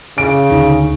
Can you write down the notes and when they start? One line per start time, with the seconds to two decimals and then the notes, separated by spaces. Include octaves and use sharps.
0.18 C#3 D7
0.50 D2 D3 D#3 D#4